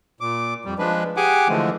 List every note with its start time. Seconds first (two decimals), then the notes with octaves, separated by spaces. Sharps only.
0.21 A#2 D6
0.65 F2 G3
0.79 F3 G#3 D4 B4
1.17 G4 G#4 F#5 G#5 D6
1.49 D3 E3 F3 G#3 A3